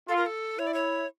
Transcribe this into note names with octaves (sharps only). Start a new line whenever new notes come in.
F4 A4
A#4
A4
E4 C#5
D5
C#5